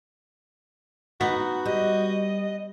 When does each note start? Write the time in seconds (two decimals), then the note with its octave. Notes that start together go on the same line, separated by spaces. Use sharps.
1.21 B3 D#4 F#4
1.66 G3 D#5